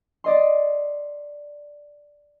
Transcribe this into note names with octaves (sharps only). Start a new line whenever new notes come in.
D5 D#5 C6